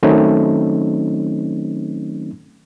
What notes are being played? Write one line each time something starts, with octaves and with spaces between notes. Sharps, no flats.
D#3 F#3 A3 C4 C#4 D#4